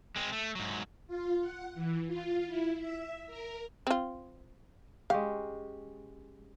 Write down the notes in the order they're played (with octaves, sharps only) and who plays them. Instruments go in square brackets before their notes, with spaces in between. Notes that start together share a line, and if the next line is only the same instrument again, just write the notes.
[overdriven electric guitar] G#3 C4
A3
G#2 F#3
[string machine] F4
F#5
E3
F4
E4
E5
A#4
[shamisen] C4 F4
[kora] G#3 C#4 G4 [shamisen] F5